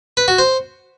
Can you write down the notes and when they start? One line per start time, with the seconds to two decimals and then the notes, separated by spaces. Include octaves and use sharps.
0.17 B4
0.28 F#4
0.38 C5